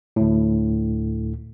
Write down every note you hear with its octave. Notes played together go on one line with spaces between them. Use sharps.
D2 A2